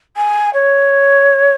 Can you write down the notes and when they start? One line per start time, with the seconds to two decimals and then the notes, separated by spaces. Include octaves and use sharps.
0.16 G#5
0.54 C#5